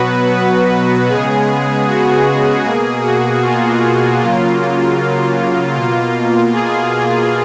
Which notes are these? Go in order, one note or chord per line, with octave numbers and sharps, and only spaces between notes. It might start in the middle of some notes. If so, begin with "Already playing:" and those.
Already playing: B2 F#3 B3 F#4 B4
B4
C#3 G#3 B3 G#4
F#4
B2 A#3 G#4
F#4
F4
C#3 F#3 A#3 F4
B2 A#3 F4
G#4